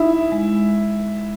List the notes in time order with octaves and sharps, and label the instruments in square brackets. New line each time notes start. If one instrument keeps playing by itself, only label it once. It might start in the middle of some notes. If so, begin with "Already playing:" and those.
Already playing: [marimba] D#4 [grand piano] E4
[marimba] G#3